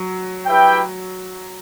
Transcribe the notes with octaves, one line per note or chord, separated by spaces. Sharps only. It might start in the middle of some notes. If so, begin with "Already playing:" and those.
Already playing: F#3
E4 G4 B4 E5 G5